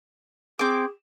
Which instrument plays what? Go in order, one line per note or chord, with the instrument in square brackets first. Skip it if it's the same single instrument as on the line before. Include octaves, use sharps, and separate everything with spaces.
[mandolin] C4 D6 [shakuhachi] G#4